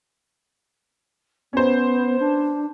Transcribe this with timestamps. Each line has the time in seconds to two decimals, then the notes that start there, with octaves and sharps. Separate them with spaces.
1.53 B3 C#4 C5
2.20 D4